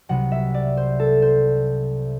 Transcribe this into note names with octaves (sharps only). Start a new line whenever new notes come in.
C2 C3 F#3 F#5
E5
D5
C5
A4
C5